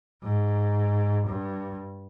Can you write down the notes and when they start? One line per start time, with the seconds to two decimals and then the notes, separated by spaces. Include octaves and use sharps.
0.23 G#2
1.27 G2